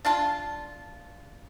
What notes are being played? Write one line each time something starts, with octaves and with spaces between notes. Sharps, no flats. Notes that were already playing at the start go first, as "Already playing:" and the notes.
D4 F4 A5